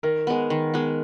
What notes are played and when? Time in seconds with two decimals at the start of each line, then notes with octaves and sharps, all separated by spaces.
0.03 D#3 A#4
0.27 G#3 B3
0.50 D#3
0.74 G#3 B3